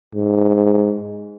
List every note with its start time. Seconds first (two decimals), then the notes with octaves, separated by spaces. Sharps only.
0.15 G#2